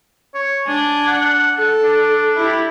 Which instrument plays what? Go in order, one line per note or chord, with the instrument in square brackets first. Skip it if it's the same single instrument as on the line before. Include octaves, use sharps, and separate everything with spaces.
[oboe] C#5
[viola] D4 [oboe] G#5
[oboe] F#5
[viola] A4
[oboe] D4
[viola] E4 G4